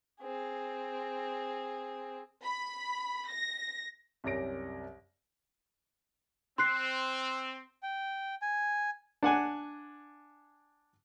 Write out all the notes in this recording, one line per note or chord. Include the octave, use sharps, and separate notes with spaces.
C4 G#4
B5
A#6
C2 F#2 G4 C#5 A#6 D7
C4 C6 F#6 C7
G5
G#5
D4 F#5 G#5